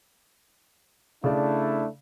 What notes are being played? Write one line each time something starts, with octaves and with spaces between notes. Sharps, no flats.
C#3 A3 D4 E4 D5